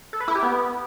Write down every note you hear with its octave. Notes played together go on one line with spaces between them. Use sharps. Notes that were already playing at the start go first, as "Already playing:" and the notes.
A4
B4
E4
G4
B3